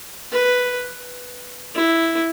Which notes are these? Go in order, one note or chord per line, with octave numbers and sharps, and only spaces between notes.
B4
E4